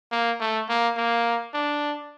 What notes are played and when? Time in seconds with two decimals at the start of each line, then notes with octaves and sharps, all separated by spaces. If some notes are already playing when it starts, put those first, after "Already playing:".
0.12 A#3
0.40 A3
0.69 A#3
0.97 A#3
1.54 D4